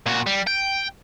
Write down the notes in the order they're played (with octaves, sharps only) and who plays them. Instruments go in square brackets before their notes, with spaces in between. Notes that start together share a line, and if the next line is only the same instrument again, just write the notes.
[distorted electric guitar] A#2 F#4
G3
G5